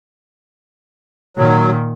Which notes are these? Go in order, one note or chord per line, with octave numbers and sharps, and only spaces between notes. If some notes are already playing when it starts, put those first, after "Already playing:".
A#2 D#3 F#3